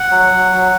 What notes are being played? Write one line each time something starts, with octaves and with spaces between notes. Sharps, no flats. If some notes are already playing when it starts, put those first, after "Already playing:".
Already playing: F#5
F#3
F#3
F#3